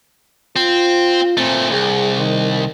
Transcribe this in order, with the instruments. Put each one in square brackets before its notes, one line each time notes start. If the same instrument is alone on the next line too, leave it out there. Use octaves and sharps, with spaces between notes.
[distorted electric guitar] C4 [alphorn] F4
[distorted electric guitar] A#2 A3 [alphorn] C4
[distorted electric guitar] C2 [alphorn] G#4
[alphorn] D#3